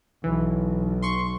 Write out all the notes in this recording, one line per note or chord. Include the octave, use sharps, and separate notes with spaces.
B1 E3
C6 C#6